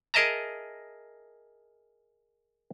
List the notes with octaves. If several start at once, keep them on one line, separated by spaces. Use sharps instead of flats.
G#4 A#4 D#5 E5 A5 A#5